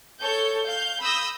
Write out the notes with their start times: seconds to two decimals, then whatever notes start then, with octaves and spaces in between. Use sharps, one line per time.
0.21 A4 C#5 G6
0.66 F5 G6
1.01 B5 D#6 E6 G6 A#6